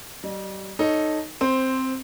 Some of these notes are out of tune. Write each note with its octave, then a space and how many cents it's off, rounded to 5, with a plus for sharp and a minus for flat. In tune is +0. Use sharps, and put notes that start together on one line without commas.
G3 -35 D#5 -45
D#4 -5 A4 +0 C#5 +0
C4 +0 C5 +5